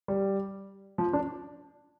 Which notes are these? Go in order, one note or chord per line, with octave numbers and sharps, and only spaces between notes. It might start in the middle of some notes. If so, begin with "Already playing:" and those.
G3
F3
D4